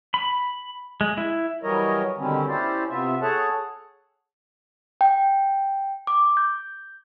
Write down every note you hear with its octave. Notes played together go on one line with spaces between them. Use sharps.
B5
G#3
E4
E3 F#3 G3 A#4 C#5 D#5
B2 D3 D#3 G3 C4 C#4
C#4 E4 G4 C5 D5
C3 B3 F4 E5
G#4 A4 C#5 F#5 A5
G5
D6
G6